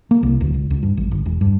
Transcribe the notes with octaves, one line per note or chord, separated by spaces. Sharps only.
A#3
C2
D1
C#2
C#2
G2
G#1
G1
E1
G2